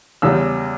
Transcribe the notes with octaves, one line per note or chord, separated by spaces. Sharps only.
E2 C#3 G3 E6